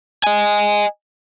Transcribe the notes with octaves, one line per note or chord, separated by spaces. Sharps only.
D#5 G#5